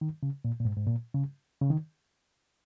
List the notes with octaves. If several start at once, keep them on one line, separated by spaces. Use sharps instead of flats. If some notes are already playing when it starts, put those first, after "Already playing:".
D#3
C#3
A#2
A#2
G#2
G#2
A#2
C#3
C#3
D#3